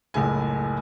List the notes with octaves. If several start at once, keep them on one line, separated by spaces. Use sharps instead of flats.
F#1 C#2 A2 G#5